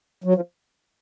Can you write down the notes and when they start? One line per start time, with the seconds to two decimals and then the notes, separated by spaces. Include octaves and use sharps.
0.24 F#3
0.35 F3